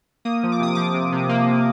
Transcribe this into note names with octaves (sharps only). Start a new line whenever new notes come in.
A#3 D#6
F3
D6
C3 D#6
F3 D6
C3
C3
A#3
C3